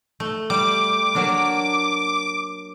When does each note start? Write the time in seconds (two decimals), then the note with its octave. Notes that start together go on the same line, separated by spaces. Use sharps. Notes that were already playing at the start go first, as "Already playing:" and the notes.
0.20 A3
0.50 G3 D6
1.15 F#3 A#3 D4